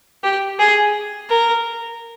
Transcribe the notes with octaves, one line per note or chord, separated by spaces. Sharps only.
G4
G#4
A#4